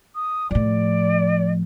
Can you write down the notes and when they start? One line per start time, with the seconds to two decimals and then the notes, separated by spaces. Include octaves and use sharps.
0.15 D#6
0.51 A2 F3 D5